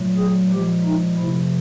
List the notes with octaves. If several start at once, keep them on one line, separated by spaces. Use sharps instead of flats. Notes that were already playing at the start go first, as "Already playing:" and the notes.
Already playing: A#2 F#3 A3
G#4
A#2 F3 G#3 G4
D#4
C3 F3 A3 E4